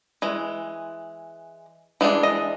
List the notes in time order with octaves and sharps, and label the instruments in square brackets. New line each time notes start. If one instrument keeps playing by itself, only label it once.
[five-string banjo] E3 G#3
E3 G#3 D4
D#5